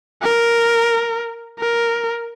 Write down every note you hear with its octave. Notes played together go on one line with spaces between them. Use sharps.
A#4
A#4